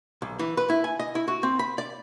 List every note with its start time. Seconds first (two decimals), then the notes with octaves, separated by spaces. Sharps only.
0.22 B1
0.39 E3
0.57 B4
0.70 E4
0.84 G#5
0.99 D#5
1.15 E4
1.28 F#4
1.43 C4
1.59 B5
1.78 D5